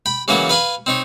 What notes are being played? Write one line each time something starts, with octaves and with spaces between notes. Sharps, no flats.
G5 B5
C#3 E3 F#3 A#3 F#4 C#5
B4 F5 G#5 B5
C4 D#4 C#5